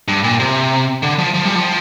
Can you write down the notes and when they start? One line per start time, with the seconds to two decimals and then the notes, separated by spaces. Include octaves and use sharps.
0.08 G2
0.24 A#2
0.40 C3
1.03 D3
1.19 F3
1.34 F3
1.45 G3
1.55 F3